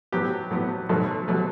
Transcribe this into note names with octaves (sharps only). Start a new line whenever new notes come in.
A2 F#3 B3 G4
A2 F#3 B3
B1 B2 F#3 A3 A4
B2 F#3 A3